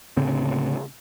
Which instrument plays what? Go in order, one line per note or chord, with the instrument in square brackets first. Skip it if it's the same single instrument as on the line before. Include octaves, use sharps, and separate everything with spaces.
[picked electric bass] D2 A2 C#3 C4